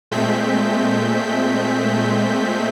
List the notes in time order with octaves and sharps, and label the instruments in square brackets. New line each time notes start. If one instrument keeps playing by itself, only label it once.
[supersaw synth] A#2 G#3 A3 C4 G6 B6